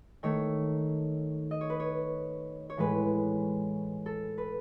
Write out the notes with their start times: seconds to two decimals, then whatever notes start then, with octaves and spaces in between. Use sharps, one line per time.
0.23 D#3 A3 C#5
1.51 D#5
1.61 C#5
1.70 B4
1.80 C#5
2.70 C#5
2.77 A2 E3 G#3 B4
4.06 A4
4.38 B4